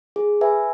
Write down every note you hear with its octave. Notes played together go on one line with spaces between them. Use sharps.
G#4
B4 E5 G#5